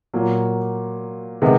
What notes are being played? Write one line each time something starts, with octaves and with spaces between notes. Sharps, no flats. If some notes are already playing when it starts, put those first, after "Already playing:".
A#2 F#3 A#3
C3 D#3 G#3 B3